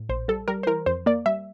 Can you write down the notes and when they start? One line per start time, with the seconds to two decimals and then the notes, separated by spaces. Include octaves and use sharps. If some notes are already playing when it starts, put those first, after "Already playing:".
Already playing: A2
0.09 A#1 C5
0.28 G3 A4
0.48 G3 A#4
0.63 C5
0.67 E3 A#4
0.86 F2 C5
1.06 A#3 D5
1.26 G3 E5